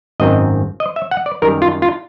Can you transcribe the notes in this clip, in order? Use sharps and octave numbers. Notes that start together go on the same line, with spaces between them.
G#1 F#2 D#3 G#3 C4 D#5
D#5
E5
F#5
D5
F#2 D#3 G3 A#4
F4
F4